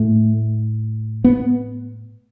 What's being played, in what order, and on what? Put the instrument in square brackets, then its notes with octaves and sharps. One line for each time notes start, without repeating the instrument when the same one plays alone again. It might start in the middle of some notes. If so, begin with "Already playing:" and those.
Already playing: [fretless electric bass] A2 A3
B3